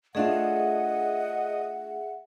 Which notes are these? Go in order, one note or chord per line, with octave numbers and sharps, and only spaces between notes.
A3 D4 F4 G#4 D#5 E5 F#5